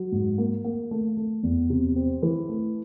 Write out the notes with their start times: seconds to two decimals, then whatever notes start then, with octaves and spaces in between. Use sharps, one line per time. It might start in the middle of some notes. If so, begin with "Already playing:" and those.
Already playing: F#3
0.12 G#2
0.38 A#3
0.65 A#3
0.91 A3
1.17 A3
1.43 E2
1.70 C3
1.96 C4
2.23 E3
2.49 A3